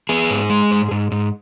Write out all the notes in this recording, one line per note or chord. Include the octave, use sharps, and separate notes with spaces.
B3 G#4
G#2
G#3
G#2
G#2
G#2